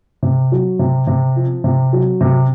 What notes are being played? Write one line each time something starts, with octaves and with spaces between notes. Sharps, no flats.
C3
F#3
C3
C3
F3
C3
F#3
C3